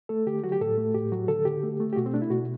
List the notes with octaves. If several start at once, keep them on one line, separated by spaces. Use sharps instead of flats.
A3 A4
D3 G4
F#3 F#4
G4
A2 A4
A3
A2 G4
F#3 F#4
D3 A4
D3 G4
A3
A3
G4
B2 F#4
C4
A3 D4
E4
B2 F#4